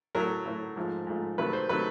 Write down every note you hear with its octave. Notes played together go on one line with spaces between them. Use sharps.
A2 F#3 A3 A#4
A2 F#3 A3
G#2 F3 A3
G#2 F3 A3
C3 D#3 F#3 A3 B4
C5
C3 D#3 F#3 A3 B4